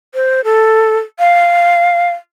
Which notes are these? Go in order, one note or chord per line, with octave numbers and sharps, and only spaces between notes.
C5
A4
F5